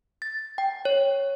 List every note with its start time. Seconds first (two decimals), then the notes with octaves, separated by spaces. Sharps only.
0.22 A6
0.58 G5
0.85 C#5